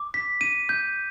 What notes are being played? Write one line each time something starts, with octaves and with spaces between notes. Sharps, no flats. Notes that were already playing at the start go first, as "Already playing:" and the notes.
Already playing: D6
B6
D#7
G6